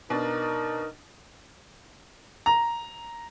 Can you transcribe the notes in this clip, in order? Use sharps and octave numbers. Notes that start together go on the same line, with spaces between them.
B2 D4 D#4 A#4
A#5